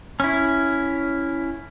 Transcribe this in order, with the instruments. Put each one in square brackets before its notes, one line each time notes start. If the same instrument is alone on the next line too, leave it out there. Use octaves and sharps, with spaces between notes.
[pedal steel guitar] C#4 E4